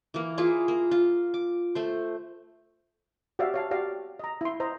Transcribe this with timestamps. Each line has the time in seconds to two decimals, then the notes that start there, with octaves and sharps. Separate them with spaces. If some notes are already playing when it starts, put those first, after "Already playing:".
0.14 E3 A#3
0.38 A#3 E4 F4 G#4
0.68 A#3
0.91 F4
1.34 D6
1.75 A3 C5
3.39 F#4 G4 C5 D5 E5 F5
3.54 C#5 F5 A5
3.71 F#4 G4 D5 F5
4.19 D#5 A#5
4.41 E4 C6
4.60 C5 D#5 A#5